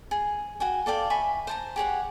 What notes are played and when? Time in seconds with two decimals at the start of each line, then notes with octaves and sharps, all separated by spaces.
0.11 G#4
0.60 F#4 G5 G#5
0.86 A4 D5 F5 G5
1.10 E5 G#5 B5 C#6
1.47 C5 A5 A#5
1.76 G4 G#4 C#5 F#5